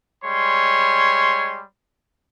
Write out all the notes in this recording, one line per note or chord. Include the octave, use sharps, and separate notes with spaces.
G3 G#3 C#5 C6